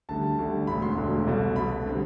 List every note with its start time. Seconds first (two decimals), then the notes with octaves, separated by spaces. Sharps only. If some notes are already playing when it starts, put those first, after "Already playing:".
0.09 D2 D3 G3 A5
0.38 D2 D3 G3
0.67 E1 D2 D3 B5
0.82 C6
0.97 E1 D2 D3
1.26 C2 B2 A3
1.56 C2 B2 A3 B5
1.86 D3 G3 C4